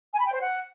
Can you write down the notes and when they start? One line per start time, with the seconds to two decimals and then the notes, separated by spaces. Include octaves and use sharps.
0.13 G#5
0.20 B5
0.26 G5
0.33 C5
0.39 F#5